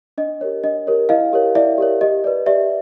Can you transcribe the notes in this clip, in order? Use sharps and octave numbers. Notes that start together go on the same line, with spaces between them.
D4 D#5
G4 A#4 C#5
D4 D#5
G4 A#4 C#5
E4 D#5 F5
G4 A#4 C#5
E4 D5 E5
G4 A#4 C#5
G4 D#5
B4 D5
G4 D5 E5